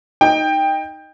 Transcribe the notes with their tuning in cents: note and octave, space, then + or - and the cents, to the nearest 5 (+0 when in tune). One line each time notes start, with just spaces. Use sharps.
D#4 +0 D#5 +0 G5 +15